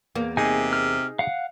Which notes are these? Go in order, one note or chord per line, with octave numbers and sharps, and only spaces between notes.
E2 A#3
C3 D#4 G#4 G#5
F6
F5 F#5